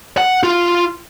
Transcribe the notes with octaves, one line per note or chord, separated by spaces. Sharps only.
F#5
F4